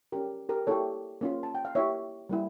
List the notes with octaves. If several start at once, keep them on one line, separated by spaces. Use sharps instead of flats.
C#4 G4 A#4
G4 A#4
A#3 E4 G4 A4 C#5
A#3 C#4 F4
A5
G5
F5
A#3 E4 G4 C#5 E5
G3 A#3 E4